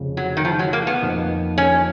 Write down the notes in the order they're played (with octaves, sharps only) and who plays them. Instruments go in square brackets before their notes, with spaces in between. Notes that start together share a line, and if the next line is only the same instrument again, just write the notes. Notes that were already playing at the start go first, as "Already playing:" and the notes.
Already playing: [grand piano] F1 F2 C#3
[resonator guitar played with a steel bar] F#3
D#3
F3
F#3
A#3
B3
[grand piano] F2 F3 A#3 D#4
[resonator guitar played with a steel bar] C#4